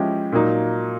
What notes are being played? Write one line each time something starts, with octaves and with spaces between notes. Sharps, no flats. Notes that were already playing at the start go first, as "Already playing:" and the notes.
Already playing: F3 G#3 C#4 E4 G4
A#2 F#3 A#3 D#4